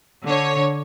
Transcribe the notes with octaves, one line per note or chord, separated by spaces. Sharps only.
D3 C#5